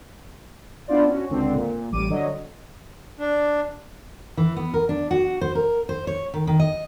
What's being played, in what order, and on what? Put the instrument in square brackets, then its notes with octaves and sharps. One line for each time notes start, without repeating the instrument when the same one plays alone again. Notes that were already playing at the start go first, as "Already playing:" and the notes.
[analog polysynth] B3 D4 E4 F4 C5 D5
C#4 F#4
C#2 D3 C4
A#2
A1 G3 D6 D#7
D3 F#3 D#5
[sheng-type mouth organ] D4
[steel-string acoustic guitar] E3
B3
A#4
D4
F#4
C5
A#4
C5
C#5
D#3
D#3
D#5